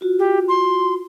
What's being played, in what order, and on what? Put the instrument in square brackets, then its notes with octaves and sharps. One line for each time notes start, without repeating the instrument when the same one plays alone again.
[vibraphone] F4 F#4
[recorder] G4
C6